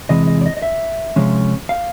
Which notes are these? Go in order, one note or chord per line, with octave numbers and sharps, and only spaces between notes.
E2 C3 E3 G#3 D#5
D#5
D5
D#5
D#5
E5
C3 F3 G#3 C#4
F5